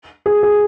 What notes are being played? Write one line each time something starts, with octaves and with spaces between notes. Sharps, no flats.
G#4
G#4